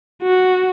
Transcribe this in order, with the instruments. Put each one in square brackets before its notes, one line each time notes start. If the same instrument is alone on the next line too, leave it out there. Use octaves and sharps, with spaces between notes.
[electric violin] F#4